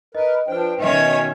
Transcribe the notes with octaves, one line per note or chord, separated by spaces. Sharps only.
A#4 B4 D#5
F3 D4 B4 C5 G5
B2 D#3 C#4 C#5 D#5 E5